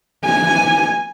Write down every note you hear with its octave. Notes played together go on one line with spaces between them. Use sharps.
G#5